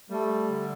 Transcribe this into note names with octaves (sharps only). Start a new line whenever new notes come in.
G3 A3
D3